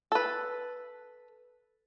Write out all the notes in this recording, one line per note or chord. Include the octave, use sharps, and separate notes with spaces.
A4 B4